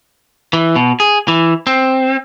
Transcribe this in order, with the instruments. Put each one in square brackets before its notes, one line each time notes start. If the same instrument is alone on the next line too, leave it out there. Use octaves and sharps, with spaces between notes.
[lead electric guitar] E3
B2
G#4
E3
C4